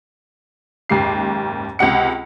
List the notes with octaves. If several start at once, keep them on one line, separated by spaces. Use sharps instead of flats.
F#1 D#2 G#2 G4 C7
C#2 C3 F#5 C#7